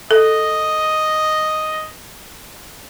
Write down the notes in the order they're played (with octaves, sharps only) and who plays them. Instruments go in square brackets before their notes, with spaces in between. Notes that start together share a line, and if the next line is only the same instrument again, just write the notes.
[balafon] A4 [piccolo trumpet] D#5